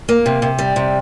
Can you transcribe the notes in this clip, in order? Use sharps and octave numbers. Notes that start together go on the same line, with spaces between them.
A#3
C3
C3
G3
C3